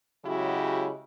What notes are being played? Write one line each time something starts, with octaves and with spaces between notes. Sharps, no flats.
C#3 F#3 G#3 E4 F#4 G4